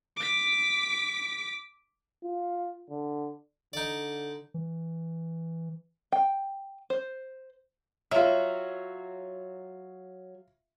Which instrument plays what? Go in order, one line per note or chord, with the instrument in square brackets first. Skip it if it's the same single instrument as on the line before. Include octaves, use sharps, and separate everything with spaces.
[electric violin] D6 B6
[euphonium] F4
D3
[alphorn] D3 [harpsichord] D#4 D5
[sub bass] E3
[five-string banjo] G5
C5
[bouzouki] F#3 F#4 [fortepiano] F4 E5